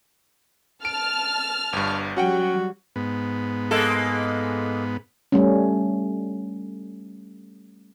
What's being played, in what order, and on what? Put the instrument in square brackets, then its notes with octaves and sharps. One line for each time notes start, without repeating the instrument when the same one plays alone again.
[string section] A5 F6 [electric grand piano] D7
[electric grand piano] G1 G2
[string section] F#3 G3 [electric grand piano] C#4 F#5 G5 [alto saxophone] F#4
[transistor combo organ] G#2 B3
[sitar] G#3 A#3 A4
[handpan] G3 A3 C#4